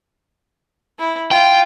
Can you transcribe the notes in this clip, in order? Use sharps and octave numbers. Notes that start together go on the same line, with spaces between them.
E4
F4 G5